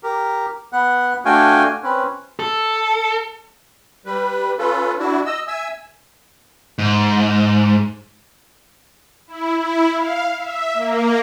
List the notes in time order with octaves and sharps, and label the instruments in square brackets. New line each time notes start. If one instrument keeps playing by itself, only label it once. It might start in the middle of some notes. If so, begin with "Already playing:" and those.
[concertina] G4 A#4
B3 F#5
A3 D4 F#4 F5 G5 G#5
C4 C#4 B4
[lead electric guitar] A4
[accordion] G3 B4
C#4 F4 A4 B4
D4 E4 F#4
D#5 E6
E5 G#5 E6
[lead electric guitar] G#2
[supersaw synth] E4
E4
F5
E5
A#3